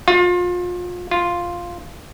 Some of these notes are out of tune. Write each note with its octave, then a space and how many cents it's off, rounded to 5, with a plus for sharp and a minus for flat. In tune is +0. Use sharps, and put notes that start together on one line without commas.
F4 +30
F4 +0